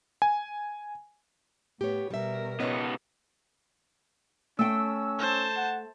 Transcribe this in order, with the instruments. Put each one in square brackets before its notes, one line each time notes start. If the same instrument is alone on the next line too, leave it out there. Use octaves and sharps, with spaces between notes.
[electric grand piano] G#5
[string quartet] A2 B3 [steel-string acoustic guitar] G4 C#5
[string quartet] B2 A#4 [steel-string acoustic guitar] G3 E5
[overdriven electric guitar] C#2 B3 [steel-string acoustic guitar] C#4 C#5 D#5
[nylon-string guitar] A3 G5 [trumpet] C#4 [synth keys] E6
[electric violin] C5 A5
[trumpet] F#5